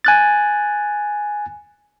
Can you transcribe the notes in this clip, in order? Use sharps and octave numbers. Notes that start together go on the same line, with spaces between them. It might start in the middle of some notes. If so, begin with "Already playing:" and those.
G#5 F#6 A6